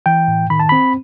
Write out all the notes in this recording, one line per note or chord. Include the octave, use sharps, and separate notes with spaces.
E3 G5
A2
D#3 B5
A5
C4 B5